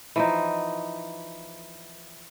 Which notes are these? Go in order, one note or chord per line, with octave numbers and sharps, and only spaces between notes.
E3 F3 D#4